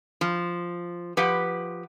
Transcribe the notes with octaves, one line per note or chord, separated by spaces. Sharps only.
F3
F3 G4 B4 F#5